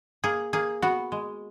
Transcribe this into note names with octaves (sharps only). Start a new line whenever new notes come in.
A#3 G#4
A#3 G#4
B3 F#4
G#3